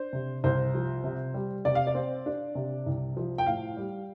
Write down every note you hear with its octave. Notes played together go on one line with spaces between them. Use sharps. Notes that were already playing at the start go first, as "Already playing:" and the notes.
Already playing: D4 C5
C3
C2 C5
F3
C3
G3
C3 D5
F5
D5
C4
D4
C3
C2
F3
G5
A2 F5
G3